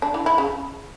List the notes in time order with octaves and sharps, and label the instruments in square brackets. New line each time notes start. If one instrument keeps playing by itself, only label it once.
[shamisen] D4
E3
E4
C#3